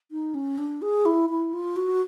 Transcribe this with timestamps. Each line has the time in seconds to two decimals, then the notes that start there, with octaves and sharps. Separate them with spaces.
0.11 D#4
0.34 C#4
0.58 D4
0.82 G#4
1.06 E4
1.30 E4
1.53 F4
1.76 F#4